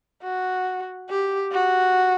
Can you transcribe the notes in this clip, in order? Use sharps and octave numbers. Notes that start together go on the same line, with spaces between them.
F#4
G4
F#4